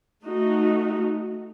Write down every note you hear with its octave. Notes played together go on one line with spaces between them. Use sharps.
A3 D#4 F#4